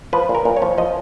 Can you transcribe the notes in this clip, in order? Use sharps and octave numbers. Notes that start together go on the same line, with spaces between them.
F3 B4
A#2
A#4
A#2
C#5
F3
F3 D#5